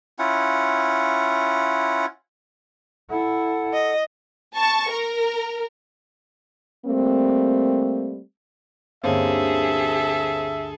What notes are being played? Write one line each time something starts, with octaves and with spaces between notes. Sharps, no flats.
C#4 E4 F4 F#5
E4 A4 F#5
D#5
A5 C#6
A#4
G3 A3 A#3 C4
D2 G2 A#3 C4 C#4 G#4 A4 E5